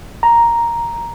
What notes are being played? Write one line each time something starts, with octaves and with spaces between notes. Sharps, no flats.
A#5